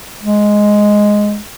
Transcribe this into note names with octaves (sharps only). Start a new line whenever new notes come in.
G#3